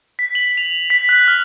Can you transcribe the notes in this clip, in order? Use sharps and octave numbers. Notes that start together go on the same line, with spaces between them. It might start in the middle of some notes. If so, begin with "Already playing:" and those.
B6
F#7
F7
B6
F#6
F6